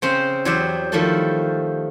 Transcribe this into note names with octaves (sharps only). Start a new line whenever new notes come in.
C#3 C4 C#4 C5
E2 F#3 G4 C5 E5 F#5
D#3 F3 G3 A3 F#4 A4